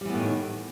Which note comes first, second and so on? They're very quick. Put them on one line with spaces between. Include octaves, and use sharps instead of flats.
G3 E3 B3 A2 D#3